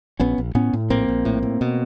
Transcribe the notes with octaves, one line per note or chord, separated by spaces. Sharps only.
A#1 B3 C#4
A#1
A2 B3 C#4
A2
A#1 A#3 C4
A#1
A2
A2
B2